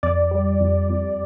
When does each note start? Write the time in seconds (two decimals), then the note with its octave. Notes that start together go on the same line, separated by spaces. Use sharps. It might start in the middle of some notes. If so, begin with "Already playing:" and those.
0.03 F2 D5
0.31 G3
0.61 F2
0.90 F2